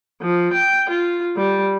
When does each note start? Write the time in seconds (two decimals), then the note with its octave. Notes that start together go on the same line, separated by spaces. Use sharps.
0.22 F3
0.54 G5
0.90 F4
1.37 G3